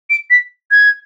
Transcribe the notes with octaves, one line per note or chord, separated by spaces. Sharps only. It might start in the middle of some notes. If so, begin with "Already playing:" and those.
D7
B6
G#6